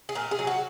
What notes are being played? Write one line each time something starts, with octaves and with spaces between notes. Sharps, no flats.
G#4
A#2 A#4
G#4
F#3
F#4